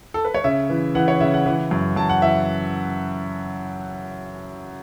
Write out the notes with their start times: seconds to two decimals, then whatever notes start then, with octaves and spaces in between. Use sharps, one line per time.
0.14 A4
0.25 B4
0.34 C#5
0.44 C#3 E5
0.70 E3
0.95 E3 F#5
1.08 C#5
1.20 C#3 E5
1.34 F#5
1.46 E3
1.71 F#2
1.96 F#2 A5
2.10 F#5
2.22 E3 E5